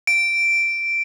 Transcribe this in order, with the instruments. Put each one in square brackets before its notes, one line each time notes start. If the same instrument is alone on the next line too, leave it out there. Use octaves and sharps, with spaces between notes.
[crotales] D7